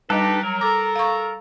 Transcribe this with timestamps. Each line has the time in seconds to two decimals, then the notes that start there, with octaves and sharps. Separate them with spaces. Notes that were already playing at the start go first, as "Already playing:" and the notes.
0.10 G3 D4 D#4 G4 A4 B4 D#5
0.43 F#3 A#4
0.61 A4 A#5 D6
0.96 F5 C#6